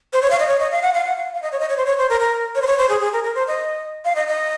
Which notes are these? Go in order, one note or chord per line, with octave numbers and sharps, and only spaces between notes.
C5
C#5
F5
D#5
C#5
D#5
F5
F#5
F5
F#5
F5
F5
D#5
C#5
D#5
C#5
C5
C#5
C5
A#4
A#4
C#5
C5
C#5
C5
G#4
G#4
A#4
A#4
C5
D#5
F5
D#5
D#5